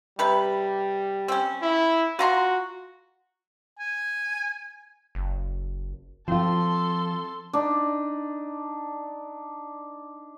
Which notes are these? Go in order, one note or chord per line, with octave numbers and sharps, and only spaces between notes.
C3 G3 B4
C4 C#4
E4
F4 F#4 A#5 C6
G#5
F#1
F3 C4 F4 A4 C6
D4 D#4